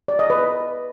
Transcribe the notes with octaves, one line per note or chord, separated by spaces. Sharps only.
D5
D#5
B4